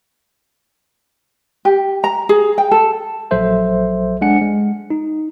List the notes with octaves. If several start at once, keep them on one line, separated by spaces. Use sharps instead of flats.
G4
A#5
G#4
G5
A4
A#1 F#3 A4 C5 E5
G#3 D4 F#5 G#5 C#7
G#3
D#4